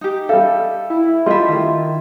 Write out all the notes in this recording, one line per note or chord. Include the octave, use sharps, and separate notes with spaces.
D#4 G4
G3 A4 E5 F5
E4
G3 A3 F4 D#5 E5 C6
D#3 E4 F4